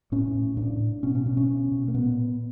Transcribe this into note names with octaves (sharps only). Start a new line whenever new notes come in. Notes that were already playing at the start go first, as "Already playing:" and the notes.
A2 C#4
A2
A2 D4
A2
B2 C#4
C#4
B2 D4
C#4
B2
B2
A#3
A#2 B3
A#2